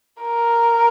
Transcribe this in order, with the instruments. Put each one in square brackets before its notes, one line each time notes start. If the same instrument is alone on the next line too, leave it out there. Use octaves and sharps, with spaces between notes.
[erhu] A#4